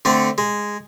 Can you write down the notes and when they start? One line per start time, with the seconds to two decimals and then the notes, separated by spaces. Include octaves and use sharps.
0.05 D3 A3 C4
0.38 G#3